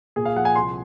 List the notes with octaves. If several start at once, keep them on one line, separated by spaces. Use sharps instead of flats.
A#2 G#4
F5
F3 F#5
G#5
C2 C6